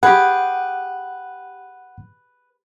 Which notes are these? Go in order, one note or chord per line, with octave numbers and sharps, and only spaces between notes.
G4 G#4 B4 F#5